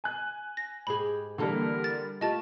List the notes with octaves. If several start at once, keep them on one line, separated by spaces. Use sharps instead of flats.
G#5 F#6
A#6
G#2 G4 G#4 B5
D3 E3 G3 A#3 A4 A#4
A6
A3 F4 G4 D#5 A5 A6